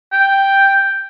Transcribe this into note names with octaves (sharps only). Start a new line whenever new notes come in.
G5